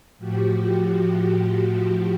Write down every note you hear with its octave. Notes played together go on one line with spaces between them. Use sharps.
A2 F3 F#4 G4